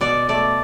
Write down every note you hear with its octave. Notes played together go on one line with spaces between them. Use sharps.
B2 D5
A3 D5